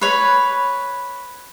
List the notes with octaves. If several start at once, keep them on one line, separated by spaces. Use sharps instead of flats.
B4 C#5 B5